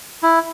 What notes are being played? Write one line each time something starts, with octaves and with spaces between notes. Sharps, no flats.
E4